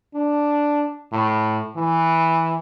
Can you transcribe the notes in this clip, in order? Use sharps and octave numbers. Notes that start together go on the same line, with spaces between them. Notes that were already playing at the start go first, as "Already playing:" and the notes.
D4
A2
E3